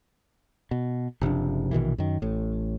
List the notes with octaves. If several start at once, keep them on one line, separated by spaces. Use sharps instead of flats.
B2
F#1 C3 F3 D4
A#1 B2 D#3 E3
F#2 D#3
A1 A2